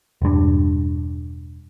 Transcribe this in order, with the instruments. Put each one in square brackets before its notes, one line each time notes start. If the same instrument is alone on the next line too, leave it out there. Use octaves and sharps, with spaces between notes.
[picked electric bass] E1 G2